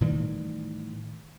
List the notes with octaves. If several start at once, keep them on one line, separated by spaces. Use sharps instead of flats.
A2 D#3 E3 G3